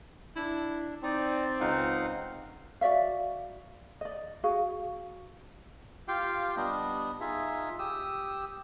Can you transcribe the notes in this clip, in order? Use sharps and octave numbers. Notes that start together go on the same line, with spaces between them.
D4 E4
C4 D#4 D5
C#2 D#4 F5 F#5
F#4 D5 E5 F5
D5 D#5
F#4 G#4 F5
F4 G4 F5 G5
G3 B3 D4 D#5
D#4 F4 G#4 E5
G4 D#6 E6